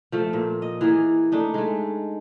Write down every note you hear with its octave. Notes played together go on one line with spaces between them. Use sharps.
F3 A3
A#2
D#5
E3 A#3 G#4
A3 D4 D#4
G#3 A3